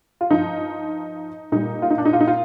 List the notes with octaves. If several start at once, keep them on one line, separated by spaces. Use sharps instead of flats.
F4
G2 F3 D#4
A#2 G3 D#4
F4
D#4
D4
D#4
F4
D#4
F4